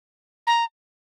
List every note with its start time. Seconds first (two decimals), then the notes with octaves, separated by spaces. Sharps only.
0.47 A#5